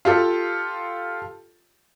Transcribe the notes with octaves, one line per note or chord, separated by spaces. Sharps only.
F4 G4 A4